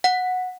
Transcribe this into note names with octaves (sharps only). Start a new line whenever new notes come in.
F#5